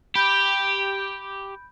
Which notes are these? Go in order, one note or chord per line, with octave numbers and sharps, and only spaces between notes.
G4 B5 G6 D7